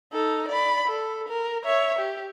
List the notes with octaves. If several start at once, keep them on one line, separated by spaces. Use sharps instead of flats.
D#4 A4
D5 B5
A4
A#4
C#5 E5
G4